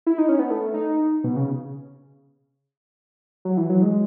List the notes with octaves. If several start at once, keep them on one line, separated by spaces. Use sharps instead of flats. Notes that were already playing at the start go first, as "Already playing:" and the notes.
E4
D#4
C#4
B3
A3
D#4
B2
C#3
F#3
E3
F#3
G#3